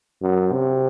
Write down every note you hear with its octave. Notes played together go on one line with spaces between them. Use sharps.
F#2
C3